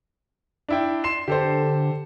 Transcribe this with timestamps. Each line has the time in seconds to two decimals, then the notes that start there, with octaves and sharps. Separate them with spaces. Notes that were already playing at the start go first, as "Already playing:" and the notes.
0.69 D4 E4 G5
1.04 C6 C7 E7
1.28 D3 G4 A4 C5